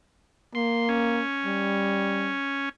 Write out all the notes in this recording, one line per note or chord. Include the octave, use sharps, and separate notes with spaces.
A#3 C6
C#4
G3